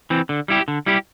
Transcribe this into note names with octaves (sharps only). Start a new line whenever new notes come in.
E3 C4
D3
G3 E4 G4
D3
G3 E4 G4